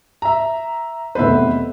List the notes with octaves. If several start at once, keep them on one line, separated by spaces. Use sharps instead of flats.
E5 A#5
F1 E2 B4 C5 E5